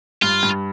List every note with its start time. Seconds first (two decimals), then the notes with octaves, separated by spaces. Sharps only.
0.22 G2 F4
0.43 G2